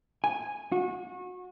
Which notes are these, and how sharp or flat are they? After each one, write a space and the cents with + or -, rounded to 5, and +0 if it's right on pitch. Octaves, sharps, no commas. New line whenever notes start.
G#5 -5
F#4 -30